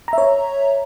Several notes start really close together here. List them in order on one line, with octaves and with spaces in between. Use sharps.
A#5 E5 C#5